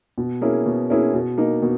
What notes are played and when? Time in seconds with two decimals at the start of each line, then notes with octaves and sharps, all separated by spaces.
0.18 B2
0.42 A#3 C#4 E4 G#4
0.66 B2
0.90 A#3 C#4 E4 G#4
1.14 B2
1.38 A#3 D#4
1.62 B2